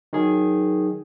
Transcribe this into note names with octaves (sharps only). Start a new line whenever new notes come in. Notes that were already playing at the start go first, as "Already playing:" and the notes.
D#3 F#3 G#4